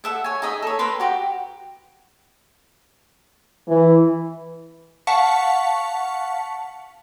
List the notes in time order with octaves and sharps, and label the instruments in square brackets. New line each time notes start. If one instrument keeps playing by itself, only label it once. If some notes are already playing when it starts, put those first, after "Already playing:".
[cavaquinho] A4 E5 F#5
C#5 G#5
D#4 G#4 D#5 E5
A4 C#5
A#4 B4 C6
F#4 G4
[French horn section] E3
[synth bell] F5 F#5 A5 C#6 B6 C#7